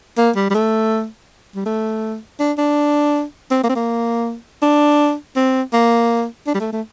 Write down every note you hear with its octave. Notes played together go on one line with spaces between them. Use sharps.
A#3
G3
G3
A3
G3
A3
D4
D4
C4
A#3
C4
A#3
D4
C4
A#3
D4
G3
A3
A3